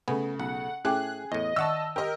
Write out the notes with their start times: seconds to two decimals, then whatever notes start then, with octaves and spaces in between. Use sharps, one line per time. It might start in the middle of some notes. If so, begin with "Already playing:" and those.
0.08 C#3 A3 B3 G#5
0.40 B1 F#5
0.85 A2 A3 C#4 G#4 G5 D6 F#6
1.32 E2 A2 D#5
1.56 D#3 E5 F#5 A5 C#6 E6
1.96 G4 A#4 D#5